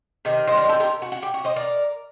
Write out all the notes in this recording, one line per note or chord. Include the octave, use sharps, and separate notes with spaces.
C3 D#3
C5 D#5
A#4 D5
A4 C5
G4 A#4
F#4
F#4
G4
F#4
C5 D#5
A#4 D5